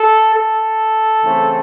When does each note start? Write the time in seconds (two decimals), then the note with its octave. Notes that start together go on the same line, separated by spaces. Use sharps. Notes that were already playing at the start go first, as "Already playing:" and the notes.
Already playing: A4
0.35 A4
1.23 C#3 E3 A3 C4